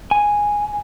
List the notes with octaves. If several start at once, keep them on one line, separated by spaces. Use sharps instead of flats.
G#5